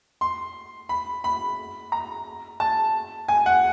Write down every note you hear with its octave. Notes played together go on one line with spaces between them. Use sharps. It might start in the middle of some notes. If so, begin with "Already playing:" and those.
C6
B5
B5
A#5
A5
G#5
F#5